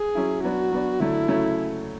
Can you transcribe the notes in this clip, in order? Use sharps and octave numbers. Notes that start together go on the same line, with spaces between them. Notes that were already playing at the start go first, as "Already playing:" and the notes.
Already playing: G#4
F#3 C#4 E4
F#3 B3 D4 F#4
F#3 B3 D4
D3 F#3 A3 E4
C#3 F#3 A3 C#4